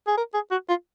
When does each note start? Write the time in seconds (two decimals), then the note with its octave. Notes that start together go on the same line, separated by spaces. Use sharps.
0.07 G#4
0.17 A#4
0.34 G#4
0.51 F#4
0.69 F4